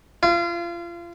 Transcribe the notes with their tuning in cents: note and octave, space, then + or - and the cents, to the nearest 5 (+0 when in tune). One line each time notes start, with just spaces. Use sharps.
F4 -30